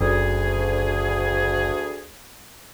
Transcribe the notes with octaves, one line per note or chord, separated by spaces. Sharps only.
F#1 D2 G#4